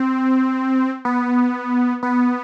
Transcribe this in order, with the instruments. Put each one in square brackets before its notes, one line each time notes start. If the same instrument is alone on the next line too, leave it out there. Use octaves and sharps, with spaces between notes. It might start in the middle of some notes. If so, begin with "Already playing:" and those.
Already playing: [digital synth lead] C4
B3
B3